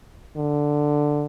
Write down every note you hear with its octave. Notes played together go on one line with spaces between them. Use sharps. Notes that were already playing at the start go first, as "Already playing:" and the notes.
D3